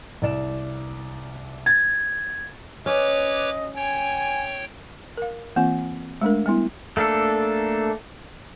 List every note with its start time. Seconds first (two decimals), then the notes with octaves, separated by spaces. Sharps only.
0.22 C2 D5 E7
1.66 G#6 A6
2.86 C#4 B4 C#5 D#5 D6
3.76 C#5 G5 G#5
5.17 A#4 F5
5.56 E3 A#3 C4 F4 G#5
6.21 G#3 A3 D4 A#4
6.46 G3 B3 E4
6.97 A3 A#3 D4 A4